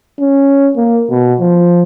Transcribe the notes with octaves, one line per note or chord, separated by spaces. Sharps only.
C#4
A#3
B2
F3